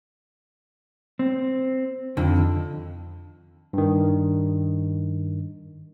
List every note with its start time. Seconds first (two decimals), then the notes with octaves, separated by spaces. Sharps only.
1.19 C4
2.17 F2 D3 D#3
3.73 G2 D#3